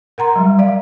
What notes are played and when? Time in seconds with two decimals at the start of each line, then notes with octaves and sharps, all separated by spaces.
0.18 A#4 F#5 A#5 C6
0.36 F#3 G3
0.59 D5 E5 F5